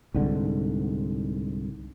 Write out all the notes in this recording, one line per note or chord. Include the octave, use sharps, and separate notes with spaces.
C2 G#2 D3